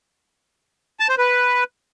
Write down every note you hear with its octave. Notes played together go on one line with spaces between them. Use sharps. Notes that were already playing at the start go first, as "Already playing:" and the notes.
A5
C5
B4